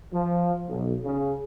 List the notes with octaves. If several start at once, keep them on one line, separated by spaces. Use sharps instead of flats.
F3
B1
C#3